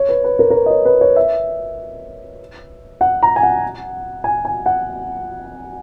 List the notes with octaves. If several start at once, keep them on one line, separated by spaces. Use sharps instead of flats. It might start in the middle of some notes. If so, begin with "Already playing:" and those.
Already playing: C#5
B4
B4
A#4
A#4
B4
D#5
C#5
B4
C#5
E5
F#5
A#5
G#5
F#5
G#5
G#5
F#5